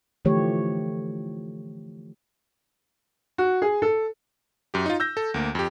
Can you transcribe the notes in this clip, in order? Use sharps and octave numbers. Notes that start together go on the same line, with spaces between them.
D3 E3 F3 A3 G4 C#5
F#4
G#4
A4
F#2 G4
D#4 F4
E6 G6 A#6
A4
D2 A#3
F2 G4